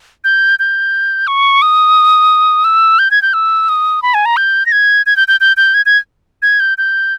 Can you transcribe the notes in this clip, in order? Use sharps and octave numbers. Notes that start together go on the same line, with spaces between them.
G6
G6
C#6
D#6
E6
G6
G#6
G6
E6
D#6
B5
G#5
A#5
G6
A#6
G#6
G#6
G6
G6
G6
G6
G#6
G#6
G#6
G6
G6